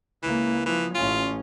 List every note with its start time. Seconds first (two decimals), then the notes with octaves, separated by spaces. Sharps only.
0.23 C#2 E3 A#3
0.66 E3 F3
0.95 A1 C#4 F4